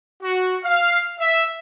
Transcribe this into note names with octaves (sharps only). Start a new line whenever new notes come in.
F#4
F5
E5